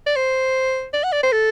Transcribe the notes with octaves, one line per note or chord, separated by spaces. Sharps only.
D5
C5
D5
F#5
D5
C5
A4